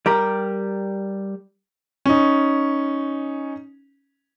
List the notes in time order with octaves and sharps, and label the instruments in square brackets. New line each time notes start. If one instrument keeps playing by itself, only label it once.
[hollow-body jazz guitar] G3 G4 A#4
[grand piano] C#4 D#4